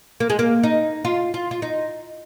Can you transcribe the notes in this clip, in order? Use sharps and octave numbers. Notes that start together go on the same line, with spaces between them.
A#3
G#3
A#3
D#4
F4
F4
F4
D#4